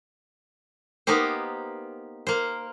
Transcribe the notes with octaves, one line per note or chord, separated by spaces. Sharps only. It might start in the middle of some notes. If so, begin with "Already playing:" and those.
A#3 B3 D#4 G4 C5
A#3 C5